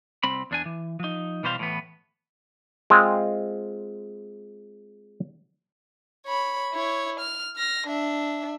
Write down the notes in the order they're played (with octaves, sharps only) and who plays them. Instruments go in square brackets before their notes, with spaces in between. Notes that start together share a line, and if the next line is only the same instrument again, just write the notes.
[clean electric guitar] C2 C4 B5
E2 D4 G#5
E3
F3 D#4
B2 E3 G3 C5 F5
A2 E3 B3
[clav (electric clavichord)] G#3 C4 F4
[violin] C#5 B5
E4 C#5
F6
F6 A#6
D4 E5